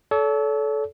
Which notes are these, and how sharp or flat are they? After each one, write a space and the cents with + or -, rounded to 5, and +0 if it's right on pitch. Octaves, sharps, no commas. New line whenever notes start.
A4 -20 C#5 +45